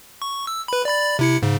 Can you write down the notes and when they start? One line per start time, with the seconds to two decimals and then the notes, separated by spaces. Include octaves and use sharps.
0.22 C#6
0.47 E6
0.68 B4 B5
0.85 D5 B5 A6
1.19 C3 E4 C#7
1.42 G#2 C#3